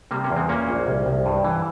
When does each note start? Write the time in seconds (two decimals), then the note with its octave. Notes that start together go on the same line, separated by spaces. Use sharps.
0.11 C3 G3 A#3
0.24 A#3 C#4
0.30 E2
0.36 G#3 C4
0.49 A#2 A#3 C#4
0.69 A#1
0.87 C2
1.06 C2
1.26 G2
1.45 E3